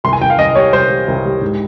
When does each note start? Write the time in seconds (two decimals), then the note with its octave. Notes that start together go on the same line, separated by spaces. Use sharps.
0.04 C2 C6
0.13 G#5
0.21 C2 G5
0.30 F5
0.39 C2 D#5
0.55 G3 C#5
0.73 C2 C5
0.90 G3
1.08 C2
1.25 G3
1.41 G#2